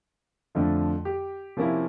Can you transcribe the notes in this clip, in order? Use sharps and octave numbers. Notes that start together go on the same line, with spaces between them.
F2 D3 F3 A3
G4
C3 F3 A#3 C#4 E4